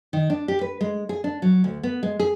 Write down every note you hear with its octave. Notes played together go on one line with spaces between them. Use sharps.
D#3
D4
G4
B4
G#3
G#4
D4
F#3
D2
B3
G#3
G#4